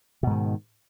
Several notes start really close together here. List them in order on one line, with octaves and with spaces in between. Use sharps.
B2 G#2 D#3